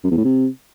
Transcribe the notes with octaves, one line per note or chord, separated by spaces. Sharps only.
F#2
E2
A2
C3